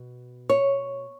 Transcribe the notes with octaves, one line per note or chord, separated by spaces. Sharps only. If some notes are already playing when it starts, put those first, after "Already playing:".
Already playing: B2
C#5